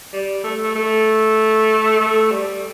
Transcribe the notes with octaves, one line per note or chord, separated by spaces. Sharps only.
G3
A3
A3
A3
A3
G3